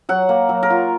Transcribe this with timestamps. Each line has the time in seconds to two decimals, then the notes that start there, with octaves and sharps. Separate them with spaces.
0.09 F#3 F#5
0.29 A#3
0.49 F#3
0.63 A#4
0.70 F4